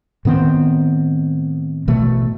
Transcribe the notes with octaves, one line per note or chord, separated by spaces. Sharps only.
A2 D#3 B3 C4
A1 B2 A3